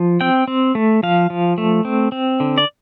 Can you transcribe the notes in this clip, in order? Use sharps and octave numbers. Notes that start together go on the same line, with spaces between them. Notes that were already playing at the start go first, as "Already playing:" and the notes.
Already playing: F3
C4 G5
C4
A3
F3 F5
F3
A3
C4
C4
D3
D5